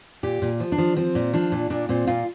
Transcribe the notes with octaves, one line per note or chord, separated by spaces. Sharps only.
A#2 G4
A#2
F3
D4
F3
F3 C4
A#2
F3 D4
A#2
A#2 D4
A#2 C4
A#2 F4